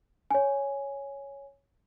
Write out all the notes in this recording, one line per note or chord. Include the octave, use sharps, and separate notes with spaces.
C#5 G#5